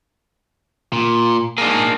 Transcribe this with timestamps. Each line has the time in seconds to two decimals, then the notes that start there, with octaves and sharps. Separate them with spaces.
0.93 A#2
1.58 A#3 D4 D#4 G#4